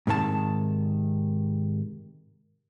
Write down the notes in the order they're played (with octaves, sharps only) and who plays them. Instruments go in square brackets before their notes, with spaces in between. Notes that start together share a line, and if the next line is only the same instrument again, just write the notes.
[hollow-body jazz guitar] G#2 C3 D#3 A5